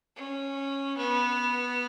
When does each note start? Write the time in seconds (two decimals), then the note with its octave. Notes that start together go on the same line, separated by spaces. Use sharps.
0.16 C#4
0.97 B3